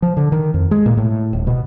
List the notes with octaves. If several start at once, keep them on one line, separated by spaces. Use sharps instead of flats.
F3
D3
D#3
F2
G#3
A#2
A2
D#1
B2